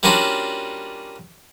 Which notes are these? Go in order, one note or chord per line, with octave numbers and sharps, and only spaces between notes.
G3 A#3 C#4 D4 F4 F#4